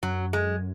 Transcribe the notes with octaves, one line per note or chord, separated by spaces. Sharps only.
F#2 F#3
G#3